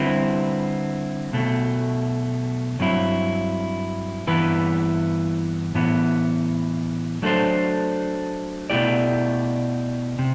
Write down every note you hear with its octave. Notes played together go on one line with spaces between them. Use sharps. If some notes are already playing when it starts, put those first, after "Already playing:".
Already playing: D3 G3 C4 E4 B4
B1 B2 A3
G2 F#3 C4 E4
G2 E3 B3 E4 B4
A2 E3 B3
F#3 A3 D4 A4 C5
B2 A3 E4 G4 D5
C3